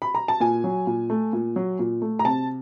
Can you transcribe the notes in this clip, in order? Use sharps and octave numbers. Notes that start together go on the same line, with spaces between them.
B5
A#5
A5
A#2 G#5
F#3
A#2
A3
A#2
F#3
A#2
A3
A#5
C3 A5